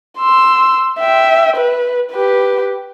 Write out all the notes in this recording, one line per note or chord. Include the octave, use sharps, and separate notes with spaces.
C6 E6
E5 G5
B4
G4 B4